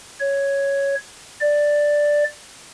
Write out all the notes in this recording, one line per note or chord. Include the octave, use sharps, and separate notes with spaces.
C#5
D5